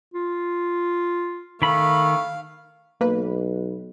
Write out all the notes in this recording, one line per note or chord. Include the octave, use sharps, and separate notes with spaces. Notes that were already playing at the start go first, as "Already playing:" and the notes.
F4
D#3 A3 F5 B5
B1 A#3 B4